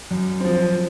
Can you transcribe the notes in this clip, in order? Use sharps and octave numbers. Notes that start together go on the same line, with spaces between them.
F#2
F3 C4